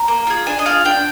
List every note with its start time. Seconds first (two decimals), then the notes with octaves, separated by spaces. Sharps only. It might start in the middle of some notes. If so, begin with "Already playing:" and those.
Already playing: A#5
0.08 A#3
0.27 F4 G#4
0.46 D4 G#5
0.59 D#5
0.66 F4 G#4 F5
0.85 D4 G5